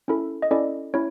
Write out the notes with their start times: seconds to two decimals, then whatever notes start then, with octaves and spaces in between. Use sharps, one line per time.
0.08 C#4 E4 A4
0.42 D#5
0.51 C#4 E4 A4 D5
0.94 C#4 E4 C#5